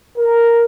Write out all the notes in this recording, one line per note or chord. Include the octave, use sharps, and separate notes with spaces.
A#4